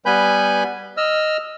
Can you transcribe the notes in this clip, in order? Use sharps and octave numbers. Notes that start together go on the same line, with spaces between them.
G3 B3 B4 G#5 B5 G6
D#5 E6 F6